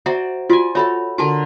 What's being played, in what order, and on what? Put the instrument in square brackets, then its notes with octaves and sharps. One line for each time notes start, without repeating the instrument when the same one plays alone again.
[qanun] F#4 C5 D5 [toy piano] E5 A#5
[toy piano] F4 F#4 [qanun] D5 G#5
[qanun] F#4 A4 A5 [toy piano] C#5 E5 B5
[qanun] D3 A#4 D6 [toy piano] F#4 A5